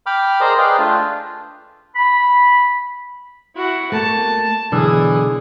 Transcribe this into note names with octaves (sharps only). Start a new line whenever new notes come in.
G5 B5 D6 F6
G#4 A#4 C5 D5 D#5 A#5
G#4 B4 D5 D#5 F5 G5
A3 D4 F4
B5
E4 F#4
A3 A#3 A5
B1 D3 E3 G#4